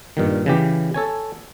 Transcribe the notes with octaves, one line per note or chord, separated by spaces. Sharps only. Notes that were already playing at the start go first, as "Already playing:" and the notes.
G2 A#2 D#3
C#3 E3 G4
A4 C#5 G#5